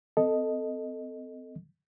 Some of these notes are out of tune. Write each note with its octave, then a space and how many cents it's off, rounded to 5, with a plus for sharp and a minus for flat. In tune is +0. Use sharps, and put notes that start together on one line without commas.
C4 -35 A4 +0 D#5 +0